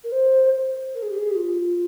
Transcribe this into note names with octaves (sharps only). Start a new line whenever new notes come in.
A#4
C5
A#4
G#4
G4
G#4
G4
F4